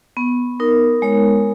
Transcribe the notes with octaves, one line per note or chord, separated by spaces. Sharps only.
B3
D#4 A#4
G#3 C#5